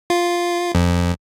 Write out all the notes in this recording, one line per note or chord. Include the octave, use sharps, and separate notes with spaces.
F4
F2